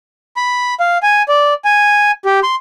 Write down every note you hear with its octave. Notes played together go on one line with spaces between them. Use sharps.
B5
F5
G#5
D5
G#5
G4
C6